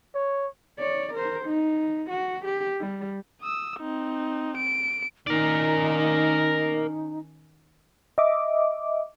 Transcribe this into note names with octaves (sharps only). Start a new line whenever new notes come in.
C#5
C#5 D5
A#4 C5
D#4
F#4
G4
G3
D#6 E6
C4 D#4
D7
D#3 C#4 D#4 A#4 D5
D#5 E5 D6